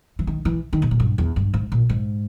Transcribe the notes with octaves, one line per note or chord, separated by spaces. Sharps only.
E3
D#3
E3
D#3
B2
A#2
G2
E2
G2
G#2
A#2
G#2